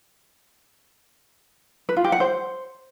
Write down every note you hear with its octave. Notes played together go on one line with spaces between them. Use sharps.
B4
F4
G4
F#5
C5